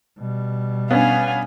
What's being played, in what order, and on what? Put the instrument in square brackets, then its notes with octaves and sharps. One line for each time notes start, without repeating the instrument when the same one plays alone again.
[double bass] B2 G3
[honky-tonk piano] B3 C#4 D4 [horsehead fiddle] F5 G#5